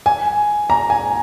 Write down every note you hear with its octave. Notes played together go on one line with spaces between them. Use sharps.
G#5
A#5
G#5